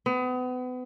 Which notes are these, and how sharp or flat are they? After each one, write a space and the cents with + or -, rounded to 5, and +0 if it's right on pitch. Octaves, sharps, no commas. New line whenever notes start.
B3 +35